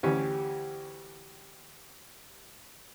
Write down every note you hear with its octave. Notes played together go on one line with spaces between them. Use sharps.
D2 E3 C#4 G4